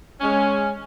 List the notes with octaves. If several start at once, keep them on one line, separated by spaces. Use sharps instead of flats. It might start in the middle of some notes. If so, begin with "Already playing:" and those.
G#3 C#4